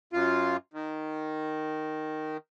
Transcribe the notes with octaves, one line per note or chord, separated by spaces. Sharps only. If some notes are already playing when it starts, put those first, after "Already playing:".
F#2 F4
D#3